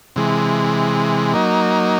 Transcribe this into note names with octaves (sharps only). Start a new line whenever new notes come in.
C3 E3 G#3
F#3 A#3 D#4